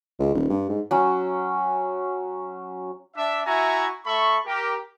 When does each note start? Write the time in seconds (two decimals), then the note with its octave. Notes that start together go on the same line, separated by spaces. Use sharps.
0.20 C#2
0.34 D#1
0.49 G2
0.69 G#2
0.91 F#3 C#4
3.17 D4 E5
3.46 E4 F#4 E5 G#5 A#5 C#6
4.06 A3 A4 E5 B5 C#6
4.46 G4 A#4